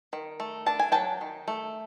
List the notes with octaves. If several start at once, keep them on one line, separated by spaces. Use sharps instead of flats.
D#3
A3
D4 A5
G#5
F#3 G5 A5
D#3
A3